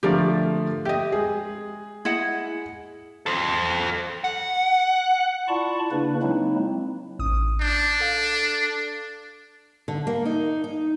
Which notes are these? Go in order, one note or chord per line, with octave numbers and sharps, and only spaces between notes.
D3 F3 A3 G4 A#4 D5
G4 D#5 E5
G#3 G#4
E4 D#5 F#5
A4 C5
F#5
E4 F4 D5 A5 B5 C#6
C#3 A#3 D4 E4 B4
F#3 G#3 A#3 C4 D#4 E4
A1 D#6
D4 G6
A4 F5
D3
A#3
D#4
D#4